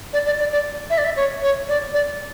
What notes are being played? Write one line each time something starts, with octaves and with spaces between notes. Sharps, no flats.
D5
D5
D5
D5
E5
D5
E5
C#5
C#5
D5
D5